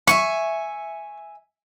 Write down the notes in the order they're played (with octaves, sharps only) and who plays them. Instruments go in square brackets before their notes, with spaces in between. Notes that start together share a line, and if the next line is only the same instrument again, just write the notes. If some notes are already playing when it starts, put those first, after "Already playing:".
[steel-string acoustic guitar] E5 F#5 G#5 [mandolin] C#6